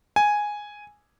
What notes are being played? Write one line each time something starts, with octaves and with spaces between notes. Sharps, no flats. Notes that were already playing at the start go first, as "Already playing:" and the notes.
G#5